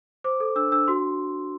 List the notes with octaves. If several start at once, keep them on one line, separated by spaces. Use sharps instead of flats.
C5 D6
A4
D4 E6
D4 E6
F#4 C6